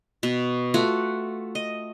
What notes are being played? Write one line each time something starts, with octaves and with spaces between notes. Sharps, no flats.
B2
A3 F4 F#4
D#5